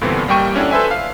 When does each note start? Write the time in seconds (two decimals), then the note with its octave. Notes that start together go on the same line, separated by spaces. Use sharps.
0.01 G2 A#2 D3 E3 B3 C4
0.28 A1 G3 A#3 G5 C#6 D#7
0.56 C#4 D4 E4 F#4 A4
0.71 A4 B4 C5 E5 G#5
0.91 F5